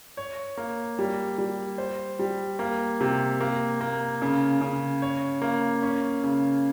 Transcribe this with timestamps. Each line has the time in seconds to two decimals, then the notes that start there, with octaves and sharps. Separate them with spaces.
0.17 C#5
0.57 A#3
0.99 G3
1.38 G3
1.78 C5
2.19 G3
2.59 A#3
3.01 C3
3.41 A#3
3.81 A#3
4.22 C#3
4.61 C#3
5.02 C#5
5.42 A#3
5.83 C#4
6.24 C#3